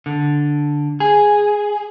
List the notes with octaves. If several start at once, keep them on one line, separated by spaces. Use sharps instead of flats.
D3
G#4